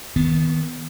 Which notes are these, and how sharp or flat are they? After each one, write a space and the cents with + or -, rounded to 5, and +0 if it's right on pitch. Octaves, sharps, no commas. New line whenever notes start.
D#3 +30 B3 +0